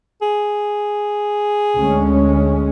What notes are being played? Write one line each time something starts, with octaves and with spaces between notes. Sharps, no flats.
G#4
D2 G#3 C#4